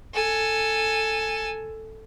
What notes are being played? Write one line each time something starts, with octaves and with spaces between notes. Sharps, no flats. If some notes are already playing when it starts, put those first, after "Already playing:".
A4 G#5